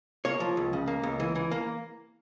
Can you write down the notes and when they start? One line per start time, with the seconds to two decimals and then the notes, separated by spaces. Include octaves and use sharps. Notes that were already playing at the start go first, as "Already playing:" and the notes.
0.25 A#3 C#5
0.40 F3
0.57 C#2
0.73 C#3
0.87 A#3
1.03 C#2
1.20 E3
1.35 E3
1.51 A#3